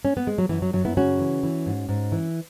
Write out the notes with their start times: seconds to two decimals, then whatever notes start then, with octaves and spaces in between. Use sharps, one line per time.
0.05 C#4
0.17 B3
0.27 G#3
0.38 F#3
0.49 F#2 E3
0.62 F#3
0.73 F#2 F#3
0.85 B3 E4
0.97 C#3 C#4 F#4
1.19 E3
1.43 E3
1.66 G#2
1.89 G#2
2.12 E3